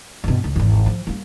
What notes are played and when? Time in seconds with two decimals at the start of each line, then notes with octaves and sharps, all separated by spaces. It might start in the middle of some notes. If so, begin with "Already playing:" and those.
0.24 G2 B2
0.44 C#2
0.56 G#1 E2
0.86 F3
1.07 G3 A#3